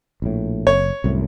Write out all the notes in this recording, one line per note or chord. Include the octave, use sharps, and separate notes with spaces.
A#1 A2
F#1 C#5
C2 F#2 A2